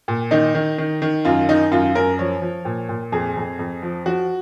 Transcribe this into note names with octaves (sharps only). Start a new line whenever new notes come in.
A#2
D#3 D#4
D#3
D#3
D#3
F#2 F4
D#3 D#4
F#2 F4
F#2 A#4
F3 C#5
F3
A#2
A#2
F2 G#4
F2
F2
F3
F3 F#4